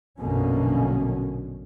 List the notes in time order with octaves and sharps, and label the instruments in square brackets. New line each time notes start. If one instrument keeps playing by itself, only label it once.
[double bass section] A#1 F#2 B2 D3 A#3 C#4